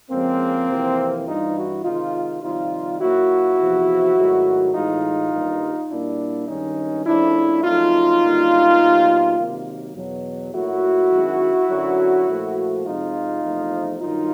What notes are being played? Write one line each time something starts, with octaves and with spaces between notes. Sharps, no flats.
F2 C#3 F3 G#3 A#3 C4
F2 C3 E3
G2 E3 G3 D#4 F4
E4 F#4
C3 D#3 G#3 D#4 F4
F2 C3 D#3 G3 D#4 F4
A#2 F#3 A#3 E4 F#4
E2 C3 F3
G#2 D#3 F#3 A3
A2 E3 G#3 D#4 F4
G2 D#3 G3 A#3
A#2 G3 A#3 D4 E4
G2 D#3 G#3 C#4 D#4
F2 C#3 F3 A3 D4 E4
F2 C#3 F#3 A3 D#4 F4
F#2 D3 G3 A#3
B2 G3 A#3
C3 D#3 F#3 A#3
E2 B2 F#3
A#2 F#3 A3 E4 F#4
F#2 D#3 G#3
F#2 D3 F#3
A#2 F3 A3
F2 C3 F3 G#3 D#4 F4
E2 C3 F3 A3
G2 D#3 F#3 D#4 F4